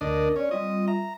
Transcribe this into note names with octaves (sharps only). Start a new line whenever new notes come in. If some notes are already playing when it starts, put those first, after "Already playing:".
D2 D4 A#4 D#5
C#4 C#5 D5
G3 C4 F4 D#5
E5 A#5